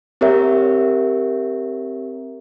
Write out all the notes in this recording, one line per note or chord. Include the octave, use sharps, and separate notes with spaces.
C4 G4 A#4 C#5 E5